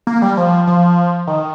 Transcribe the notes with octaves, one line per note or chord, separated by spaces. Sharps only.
A#3
G3
F3
F3
D#3